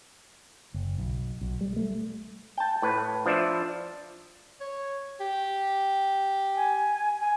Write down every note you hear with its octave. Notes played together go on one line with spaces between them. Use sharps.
F#1
B1
B1
G3
A3
G5 A5
A2 B4
F3 D4 D5 E5
C#5
G4
G#5
G#5